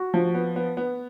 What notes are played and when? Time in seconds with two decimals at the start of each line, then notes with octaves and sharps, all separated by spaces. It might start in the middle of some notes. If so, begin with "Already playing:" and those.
Already playing: F#4
0.14 F3
0.35 B3
0.56 B3
0.77 B3